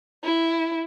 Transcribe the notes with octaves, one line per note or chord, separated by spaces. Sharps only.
E4